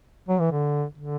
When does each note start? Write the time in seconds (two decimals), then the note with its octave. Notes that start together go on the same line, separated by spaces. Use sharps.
0.29 F#3
0.40 E3
0.52 D3
0.98 D3